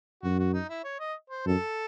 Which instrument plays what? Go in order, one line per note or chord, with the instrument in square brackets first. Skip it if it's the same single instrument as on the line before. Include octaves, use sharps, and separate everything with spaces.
[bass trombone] F#2 [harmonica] F#4
[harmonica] F#4
D#4
E4
C#5
D#5
C5
[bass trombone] F#2 [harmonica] A4